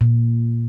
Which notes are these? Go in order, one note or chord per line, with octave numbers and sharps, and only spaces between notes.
A#2